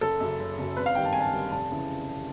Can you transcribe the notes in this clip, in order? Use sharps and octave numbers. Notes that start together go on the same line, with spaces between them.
F#1 A4
F#2 C#3
F#1
F#2 C#3
G#1 B4
F5
G2 D#3 G5
A5
G#1 G#5
A5
G2 D#3
F1 A5
C#3 E3